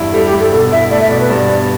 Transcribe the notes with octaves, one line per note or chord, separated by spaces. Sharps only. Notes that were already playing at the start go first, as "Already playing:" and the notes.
Already playing: E2 G2 E4
G3 A4
G4
G2
A4
B2 A4
E4 E5
A3 D5
E5
B2 D5
B4
G2 D5
B3